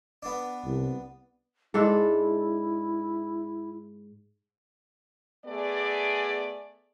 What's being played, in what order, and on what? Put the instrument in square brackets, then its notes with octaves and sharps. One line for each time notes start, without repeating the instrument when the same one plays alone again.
[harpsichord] B3 D4
[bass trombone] C2
[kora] G#2 D4 A4 [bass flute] E4
[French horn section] A3 B3 G#4 D5